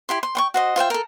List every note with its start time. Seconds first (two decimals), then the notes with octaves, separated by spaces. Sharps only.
0.09 E4 G4 C6
0.23 C6
0.35 G5 C6 C#6
0.54 F#4 C5 D#5
0.76 F4 C5 E5 G5
0.90 A4 A#4